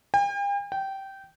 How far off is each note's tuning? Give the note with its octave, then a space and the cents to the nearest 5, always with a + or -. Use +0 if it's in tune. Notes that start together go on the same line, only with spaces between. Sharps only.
G5 +45
G5 -15